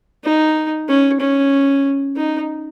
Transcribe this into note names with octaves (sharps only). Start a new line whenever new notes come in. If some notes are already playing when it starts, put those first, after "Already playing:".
D#4
C#4
C#4
D#4